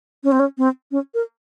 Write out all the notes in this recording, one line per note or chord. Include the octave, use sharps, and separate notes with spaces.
C#4
C4
C#4
C4
C#4
A#4